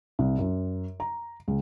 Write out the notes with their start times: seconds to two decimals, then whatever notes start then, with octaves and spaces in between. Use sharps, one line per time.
0.19 C2
0.39 F#2
1.00 A#5
1.48 C#2